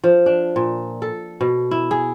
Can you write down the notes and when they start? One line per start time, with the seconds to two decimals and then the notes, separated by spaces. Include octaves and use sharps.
0.04 F3
0.26 D4
0.56 A#2
1.02 A4
1.41 B2
1.71 E4
1.91 G#4